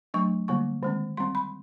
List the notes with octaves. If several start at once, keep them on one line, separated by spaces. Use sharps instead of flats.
F#3 A3 D4 C#6
D3 G3 A#3 C#6
D#3 G#3 C4
G3 C4 C6
B5